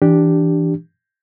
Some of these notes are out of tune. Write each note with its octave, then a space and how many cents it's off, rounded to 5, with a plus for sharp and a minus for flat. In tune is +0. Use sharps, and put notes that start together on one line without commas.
E3 +0 D4 +0 G4 +0